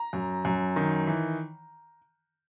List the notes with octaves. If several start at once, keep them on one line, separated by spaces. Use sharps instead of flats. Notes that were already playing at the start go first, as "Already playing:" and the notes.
Already playing: A#5
F#2
F#2
D#3
E3